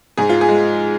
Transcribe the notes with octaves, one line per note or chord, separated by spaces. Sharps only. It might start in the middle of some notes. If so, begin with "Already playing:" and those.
G#2 G#4
F4
G#4
G#3